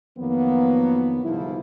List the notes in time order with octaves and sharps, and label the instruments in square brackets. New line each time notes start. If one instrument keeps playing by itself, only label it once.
[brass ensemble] F2 D#3 F3 F#3 A#3 B3
G1 C2 G#2 F3 D#4 E4